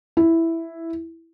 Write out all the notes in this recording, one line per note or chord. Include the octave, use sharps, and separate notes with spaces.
E4